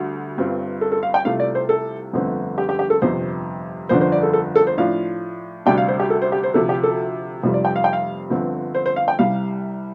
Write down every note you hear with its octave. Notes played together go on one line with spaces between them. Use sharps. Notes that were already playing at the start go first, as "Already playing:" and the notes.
Already playing: D2 D3 G3
G1 G2 G3 C4 F4
A4
A4
F5
G5
C2 C3 A3 F4 F5
D5
C5
A4
G1 F2 D3 A3 C4
G4
G4
G4
A4
G1 F2 C3 C5
G1 F2 D3 F3 D4 C5
C5
D5
A4
A4
A4
C5
A2 F3 D4 F4 F5
D2 C3 G3 D4 G5
F5
C5
G4
A4
C5
G4
C5
D2 C3 F3 A4
G4
A4
F1 F2 C3 G3 F4
D5
G5
F5
G5
F5
G1 G2 D3 F3 C4
C5
C5
F5
G5
C2 C3 G3 F5